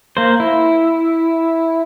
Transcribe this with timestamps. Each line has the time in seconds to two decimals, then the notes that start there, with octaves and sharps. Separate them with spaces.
0.17 A#3 C5
0.40 E4